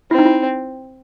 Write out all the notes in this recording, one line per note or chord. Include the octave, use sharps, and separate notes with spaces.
C4 E4
D#4
E4